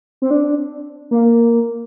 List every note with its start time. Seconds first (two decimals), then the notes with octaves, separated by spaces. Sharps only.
0.22 C4
0.31 D4
1.11 A#3